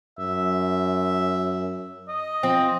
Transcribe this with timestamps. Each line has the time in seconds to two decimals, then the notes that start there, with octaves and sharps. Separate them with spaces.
0.18 F#2 E5
2.08 D#5
2.43 F3 C4